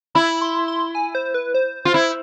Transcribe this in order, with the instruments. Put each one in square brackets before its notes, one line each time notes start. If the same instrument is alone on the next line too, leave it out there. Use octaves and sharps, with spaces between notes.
[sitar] E4 [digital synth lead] B5
[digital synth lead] C6
C6
G#5
C5
B4
C5
[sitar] F4
E4